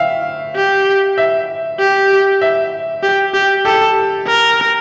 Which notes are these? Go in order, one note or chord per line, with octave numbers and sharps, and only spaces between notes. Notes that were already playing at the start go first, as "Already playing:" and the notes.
Already playing: E5 F5 G5
G4
E5
G4
E5
G4
G4
G4 A4
A#4